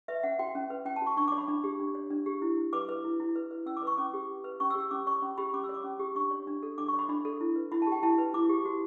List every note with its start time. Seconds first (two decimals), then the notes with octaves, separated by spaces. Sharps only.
0.08 B4 E5
0.23 C#4 F#5
0.39 F#4 G5
0.55 C#4
0.70 B4
0.86 C#4 G5
0.96 A5
1.02 F#4 C#6
1.17 D4 C#6
1.28 C#5 D6
1.38 B5
1.48 D4
1.64 G4
1.80 D4
1.95 C#5
2.10 D4
2.26 G4
2.42 E4
2.58 E4
2.73 B4 D6
2.89 B4
3.04 E4
3.20 E4
3.36 B4
3.51 B4
3.66 C#4 E6
3.77 D6
3.82 B4
3.87 C#6
3.98 C#4 D6
4.14 G4
4.29 C#4
4.44 B4
4.60 C#4 C#6
4.70 E6
4.75 G4
4.80 E6
4.91 C#4 D6
5.07 C#5 C#6
5.22 C#4 B5
5.38 G4 B5
5.54 C#4 D6
5.64 E6
5.69 C#5
5.74 D6
5.84 C#4
6.00 G4
6.15 D4 C#6
6.31 C#5
6.47 D4
6.63 A4
6.78 D4 D6
6.88 C#6
6.94 C#5 B5
7.09 D4 B5
7.25 A4
7.41 E4
7.56 B4
7.72 E4 B5
7.82 G4 A5
7.92 G5
8.03 E4 A5
8.18 B4
8.34 E4 D6
8.49 G4
8.65 F#4